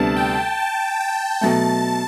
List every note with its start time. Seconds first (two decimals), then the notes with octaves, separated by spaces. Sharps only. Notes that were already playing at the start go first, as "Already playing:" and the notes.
Already playing: D2 C3 G3 B3 D4 A5
0.16 G5
0.59 A5
1.01 G5
1.41 B2 F#3 A3 A5